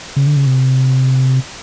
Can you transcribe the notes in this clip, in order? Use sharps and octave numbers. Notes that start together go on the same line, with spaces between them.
C#3
D3
C#3
C3